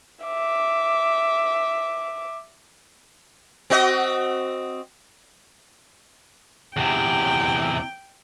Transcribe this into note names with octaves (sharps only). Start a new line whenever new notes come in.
E5 D6
C4 F#4 D#5
E2 C3 G5